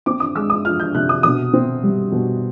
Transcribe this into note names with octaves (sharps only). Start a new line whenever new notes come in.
C4 D6
D#6
G#3 E6
D#6
F3 F6
G6
C3 F#6
D#6
B2 D#6
C4
G3
B2